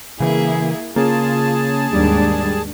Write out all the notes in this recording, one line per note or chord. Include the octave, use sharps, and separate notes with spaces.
C#3 E3 A#3 E4 G#4
C#3 A#3 F4 G#4 A5
D#2 G#2 G3 D4